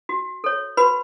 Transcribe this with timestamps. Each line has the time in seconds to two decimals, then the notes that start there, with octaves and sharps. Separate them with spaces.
0.09 F#4
0.44 A4 C#5
0.77 F#4 B4 B5